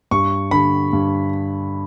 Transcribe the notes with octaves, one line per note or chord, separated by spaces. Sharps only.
G2 C#6
D3 B5
G2